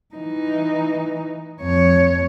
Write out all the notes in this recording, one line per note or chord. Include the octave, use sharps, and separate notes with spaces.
E3 D#4
F2 C#5